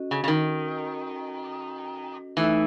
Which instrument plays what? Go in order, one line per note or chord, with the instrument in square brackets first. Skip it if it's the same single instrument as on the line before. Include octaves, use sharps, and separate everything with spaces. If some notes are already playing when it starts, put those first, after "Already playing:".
Already playing: [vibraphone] C#4 F#4 A4 D#5
[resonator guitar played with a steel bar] C#3
C#3
D#3
[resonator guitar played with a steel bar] E3 [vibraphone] A3 D#4 A4 E5